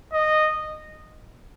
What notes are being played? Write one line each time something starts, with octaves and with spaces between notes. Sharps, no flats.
D#5